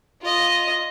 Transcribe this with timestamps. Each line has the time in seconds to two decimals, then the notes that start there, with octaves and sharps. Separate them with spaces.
0.22 F4 D#5